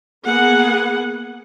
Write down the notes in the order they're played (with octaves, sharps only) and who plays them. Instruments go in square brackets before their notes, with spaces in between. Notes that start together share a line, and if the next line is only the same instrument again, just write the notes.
[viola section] A#3 B3 G#4 F#5